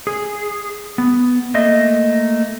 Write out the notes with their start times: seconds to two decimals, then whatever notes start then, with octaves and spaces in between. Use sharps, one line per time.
0.07 G#4
0.98 B3
1.54 A3 A#3 D#5 E5